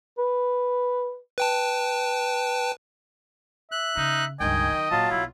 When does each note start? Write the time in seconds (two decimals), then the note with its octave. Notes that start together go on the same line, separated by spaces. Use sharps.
0.18 B4
1.38 B4 G5 A5
3.72 E5 F#6
3.97 C#3 D#4
4.40 C#2 G2 D#3 D#5 G5 G#5
4.72 F#3
4.91 A#2 F#3 F4 A5
5.11 B1 E4